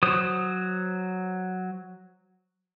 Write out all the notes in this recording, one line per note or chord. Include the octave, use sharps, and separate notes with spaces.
F#3 C5 D#6